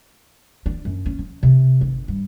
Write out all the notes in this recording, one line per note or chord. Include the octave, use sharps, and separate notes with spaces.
D4
F#2
C#4
F3
C3
G1
G2